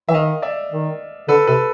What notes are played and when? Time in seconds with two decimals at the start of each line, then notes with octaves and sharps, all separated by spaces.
0.09 E3 E5
0.14 D#3 D#5 F5
0.42 D5 E5
0.71 D#3
1.28 D3 A4 B4
1.47 C3 A4 B4